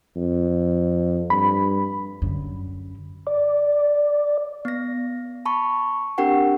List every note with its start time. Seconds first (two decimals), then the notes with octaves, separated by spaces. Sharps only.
0.16 F2
1.30 G2 B5
2.22 F#2 D3
3.27 D5
4.65 B3 A#6
5.45 A5 B5 C#6
6.18 C4 D4 G4 A#4 F#5 G5